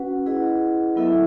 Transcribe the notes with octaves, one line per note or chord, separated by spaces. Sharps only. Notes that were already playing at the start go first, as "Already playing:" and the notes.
Already playing: C#4 F#4 B4 F#5
E4 G#4 B4 D#5 F#5
F#3 B3 E4 A4 E5